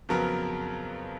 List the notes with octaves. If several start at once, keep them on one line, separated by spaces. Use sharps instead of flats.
F2 C#3 F#3 B3 A#4